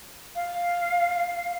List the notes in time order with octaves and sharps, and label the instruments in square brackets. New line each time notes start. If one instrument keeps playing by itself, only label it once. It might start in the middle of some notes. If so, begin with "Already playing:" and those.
[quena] F5